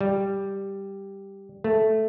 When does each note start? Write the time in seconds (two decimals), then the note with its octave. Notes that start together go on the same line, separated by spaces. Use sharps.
0.01 G3
1.64 A3